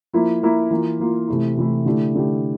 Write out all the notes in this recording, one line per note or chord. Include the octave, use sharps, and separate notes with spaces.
F3 A#3 E4
F3 A#3 E4
E3 A#3 F4
E3 A#3 F4
C3 E3 A3 E4
C3 E3 A3 E4
D3 A3 E4 G4
D3 A3 E4 G4